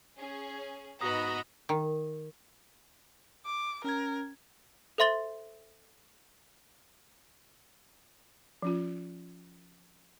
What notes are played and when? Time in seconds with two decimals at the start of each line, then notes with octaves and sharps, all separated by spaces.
0.16 C#4 G#4
1.01 G#2 B3 D#4 F#4 A#5 B5 D#6
1.69 D#3
3.45 D6
3.84 C#4 A#4 G#6
4.98 A4 C5 E5 C6 A6 G7
8.62 F3 C#4 F4